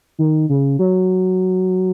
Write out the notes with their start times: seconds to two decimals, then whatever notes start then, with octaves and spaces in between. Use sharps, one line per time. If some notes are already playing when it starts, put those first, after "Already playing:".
0.19 D#3
0.49 C#3
0.79 F#3